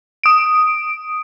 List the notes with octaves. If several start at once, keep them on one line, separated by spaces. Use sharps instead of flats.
D#6 D7